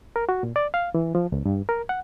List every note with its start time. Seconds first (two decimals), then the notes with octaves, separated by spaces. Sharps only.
0.16 A#4
0.29 F#4
0.43 A#2
0.56 D5
0.74 F5
0.95 E3
1.15 F3
1.32 C#2
1.46 G2
1.69 A#4
1.89 F#5